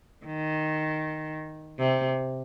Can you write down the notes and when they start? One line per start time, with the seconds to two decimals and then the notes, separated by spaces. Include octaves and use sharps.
0.26 D#3
1.78 C3